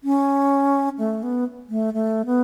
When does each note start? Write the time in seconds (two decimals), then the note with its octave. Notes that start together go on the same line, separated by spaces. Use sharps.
0.04 C#4
0.98 A3
1.23 B3
1.70 A3
1.94 A3
2.26 B3